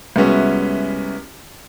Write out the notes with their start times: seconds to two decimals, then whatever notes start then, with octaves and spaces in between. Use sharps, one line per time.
0.16 C2 G#3 B3 C#4 F#4 E5